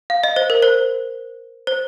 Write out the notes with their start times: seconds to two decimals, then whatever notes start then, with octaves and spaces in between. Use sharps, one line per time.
0.10 F5
0.24 D#5
0.36 C5
0.50 A#4
0.62 C5
1.67 C5